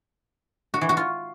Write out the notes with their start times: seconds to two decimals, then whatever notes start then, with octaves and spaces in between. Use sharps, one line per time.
0.74 F#4
0.81 E3
0.89 F#4
0.97 F4